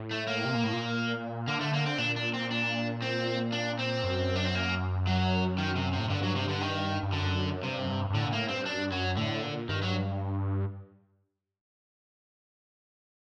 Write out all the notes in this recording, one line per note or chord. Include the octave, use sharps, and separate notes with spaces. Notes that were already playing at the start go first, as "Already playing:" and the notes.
Already playing: A2
A3
A#3
C3
A#2
A2
A#2
D3 A#3
A3
A#3
C4
A#2 D4
D4
C4
D4
C4
D4
C4
F#2
D4
C4
A#3
F#3
D#3
C3
C3
A2
G2 D3
F#3
C3
D3
D#3
G2
F#2 D3
G2 C3
F#2
G2
G2
A2 D3
A#2
A2 A#3
G2 C4
F#2 D4
G2
F#2 F#3
A2 D3
A#2
G2 D#3
F#3